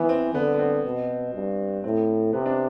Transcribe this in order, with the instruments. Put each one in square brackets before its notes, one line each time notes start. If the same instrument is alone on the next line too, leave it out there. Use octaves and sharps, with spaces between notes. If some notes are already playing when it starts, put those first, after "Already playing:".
Already playing: [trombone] E3 [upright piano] B3
[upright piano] C4
[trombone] D3 [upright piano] B3
[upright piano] B3
C4
[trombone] B2
G2
[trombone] A2 [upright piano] C4
[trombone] C3 [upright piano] B3
[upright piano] D4